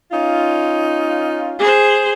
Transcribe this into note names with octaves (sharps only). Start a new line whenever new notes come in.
C#4 D#4 F4
G#4 C5